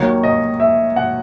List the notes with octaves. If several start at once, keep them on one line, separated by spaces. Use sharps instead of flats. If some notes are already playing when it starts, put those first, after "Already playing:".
Already playing: D#2 D#3 F#3 A#3 C#5
D#5
E5
F#5